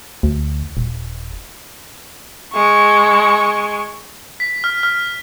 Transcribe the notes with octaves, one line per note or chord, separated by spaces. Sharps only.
D2
D#1
G#3 C#6
B6
F6
F6